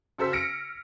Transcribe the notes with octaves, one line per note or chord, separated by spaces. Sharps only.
C#3 F#4 A4 C5 E6 B6
F6 A#6 C#7 D7